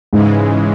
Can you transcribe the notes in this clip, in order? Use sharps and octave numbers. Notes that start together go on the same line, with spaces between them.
G#2 C#3 E3 G#3